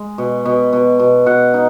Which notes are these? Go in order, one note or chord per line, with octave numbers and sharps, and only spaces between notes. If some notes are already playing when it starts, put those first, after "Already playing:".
Already playing: G#3
B2
B2
B2
B2
B2 F#5
D#4